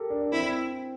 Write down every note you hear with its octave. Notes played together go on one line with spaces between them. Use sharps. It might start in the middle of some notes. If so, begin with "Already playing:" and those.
Already playing: G4 A4 A#4
D4
D4
C4 E4